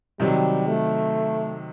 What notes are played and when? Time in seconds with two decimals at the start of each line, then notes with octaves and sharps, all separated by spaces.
0.20 C3 D#3 F#3 G3
0.68 A3